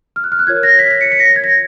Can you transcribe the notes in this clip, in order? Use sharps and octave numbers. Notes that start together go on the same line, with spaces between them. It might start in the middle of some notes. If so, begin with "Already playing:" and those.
F6
F#6
F6
F#6
F4 A#4 C#5 G#6
A#6
B6
B6
C#7
B6
A#6
G#6
A#6